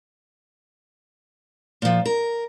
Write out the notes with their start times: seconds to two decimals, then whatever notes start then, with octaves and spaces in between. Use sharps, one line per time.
1.82 A#2 F3
2.06 A#4